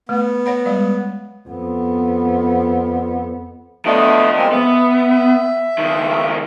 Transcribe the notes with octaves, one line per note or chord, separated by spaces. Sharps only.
A3 B3
C#5 F#5 B5
G3 G#3 D5
F2 B3
F3 A3 B3 D4 D#5
G#3 A#3 C4
B3 E5
C#2 D#3